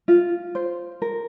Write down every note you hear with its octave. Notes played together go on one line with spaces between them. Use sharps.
F4
C5
A#4